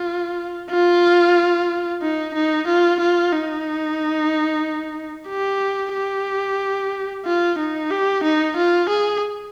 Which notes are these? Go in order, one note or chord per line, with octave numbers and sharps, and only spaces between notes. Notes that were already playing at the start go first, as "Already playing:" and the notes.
Already playing: F4
F4
D#4
D#4
F4
F4
D#4
G4
G4
F4
D#4
G4
D#4
F4
G#4